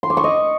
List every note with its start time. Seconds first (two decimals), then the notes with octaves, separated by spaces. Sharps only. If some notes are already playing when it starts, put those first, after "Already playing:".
0.03 C6
0.10 D6
0.17 C#6
0.24 D#5